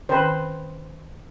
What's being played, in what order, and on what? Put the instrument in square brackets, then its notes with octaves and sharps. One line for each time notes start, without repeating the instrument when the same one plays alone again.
[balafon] D#3 C#4 G5 [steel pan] B4 C5